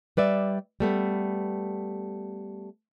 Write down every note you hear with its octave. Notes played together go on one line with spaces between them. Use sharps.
G3 B4 D5 E5
G3 A3 B3